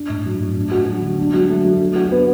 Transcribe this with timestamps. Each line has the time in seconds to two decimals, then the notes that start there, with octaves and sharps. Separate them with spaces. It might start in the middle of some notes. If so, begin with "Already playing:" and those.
Already playing: D4
0.10 A2
0.26 F#3
0.40 A2
0.57 D4
0.71 F#4
0.88 F#3
1.02 D3
1.19 D4
1.34 F#3
1.49 A3
1.65 F#3
1.81 D4
1.95 F#4
2.12 B3